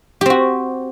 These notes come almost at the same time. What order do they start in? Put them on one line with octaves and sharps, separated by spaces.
G4 C4 F#4